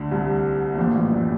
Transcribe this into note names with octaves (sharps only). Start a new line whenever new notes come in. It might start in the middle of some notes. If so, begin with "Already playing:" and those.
Already playing: D2 D3
C2 C3
A2
A#1 A#2
A1 A2
F#2